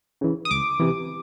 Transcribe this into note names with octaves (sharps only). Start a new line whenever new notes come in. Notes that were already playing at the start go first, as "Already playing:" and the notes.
C#3 E3
D#6
C#2 D6
C3 E3